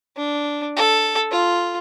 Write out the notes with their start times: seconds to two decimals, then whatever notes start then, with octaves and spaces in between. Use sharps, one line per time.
0.16 D4
0.76 A4
1.31 F4